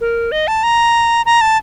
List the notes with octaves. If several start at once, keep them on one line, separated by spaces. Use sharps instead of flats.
A#4
D#5
A5
A#5
A#5
A5